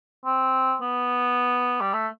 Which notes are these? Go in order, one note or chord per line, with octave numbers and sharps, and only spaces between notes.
C4
B3
G3
A3